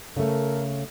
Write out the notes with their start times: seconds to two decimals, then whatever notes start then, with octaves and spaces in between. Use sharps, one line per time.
0.16 C#3 A3 A4 A#4